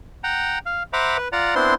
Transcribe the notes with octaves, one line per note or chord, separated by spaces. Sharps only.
F#5 G5 A#5
F5
C5 E5 F#5 A#5 B5 D6
B4
F4 D5 F#5 A#5
B3 C4 D4 E4 C5 C6